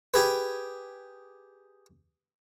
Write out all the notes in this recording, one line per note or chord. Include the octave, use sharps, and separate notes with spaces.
G4 G#4 B4